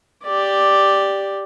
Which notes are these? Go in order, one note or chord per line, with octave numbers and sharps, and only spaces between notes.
G4 D5